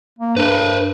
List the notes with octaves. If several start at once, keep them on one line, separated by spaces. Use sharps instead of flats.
A#3
G2 A#4 B4